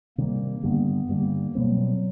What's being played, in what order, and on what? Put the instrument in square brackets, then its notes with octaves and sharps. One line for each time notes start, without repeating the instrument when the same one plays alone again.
[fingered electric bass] C3 D#3 G3 [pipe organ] A#3
[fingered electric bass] G2 D3 G3 [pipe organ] B3
[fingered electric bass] G2 D3 G3 [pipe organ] A#3
[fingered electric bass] B2 G3 C4 [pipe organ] F#3